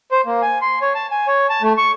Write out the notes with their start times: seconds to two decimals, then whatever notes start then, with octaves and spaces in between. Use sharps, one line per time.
0.12 C5
0.26 A#3
0.42 G#5
0.62 C6
0.82 C#5
0.95 A5
1.11 G#5
1.27 C#5
1.50 A5
1.62 A3
1.78 C#6